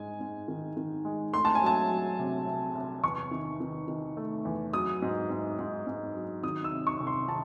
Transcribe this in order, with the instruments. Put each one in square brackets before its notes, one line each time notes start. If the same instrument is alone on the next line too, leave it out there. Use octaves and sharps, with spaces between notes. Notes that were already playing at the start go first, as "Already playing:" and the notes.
Already playing: [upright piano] G#2 G#3 G#5
G#2
D#3
D#3
G#3
A3 C6
A5
G#5
F#3 A5
F#3
C3
C2
C2
E2 C#6
D#3
D#3
D#3
A3
E2
F#3 D#6
G#2
G#2
G#2
G#2
F#3
D#3 D#6
E6
C3
C#6
C2
C6
D#3 A5